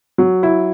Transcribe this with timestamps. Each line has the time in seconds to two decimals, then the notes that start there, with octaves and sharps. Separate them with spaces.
0.18 F#3
0.43 E4